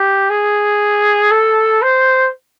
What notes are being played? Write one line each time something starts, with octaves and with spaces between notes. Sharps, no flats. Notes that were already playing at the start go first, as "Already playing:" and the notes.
Already playing: G4
G#4
A4
C5